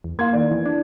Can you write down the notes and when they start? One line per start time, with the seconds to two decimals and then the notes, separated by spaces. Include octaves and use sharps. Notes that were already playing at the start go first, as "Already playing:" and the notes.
0.04 E2
0.19 A#3 F5 C6 G#6
0.33 D#3 D5
0.51 E2 E3
0.66 D4